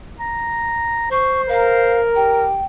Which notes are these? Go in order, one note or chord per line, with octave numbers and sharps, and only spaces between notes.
A#5
C5 C#6
A#4 F5
G4 G5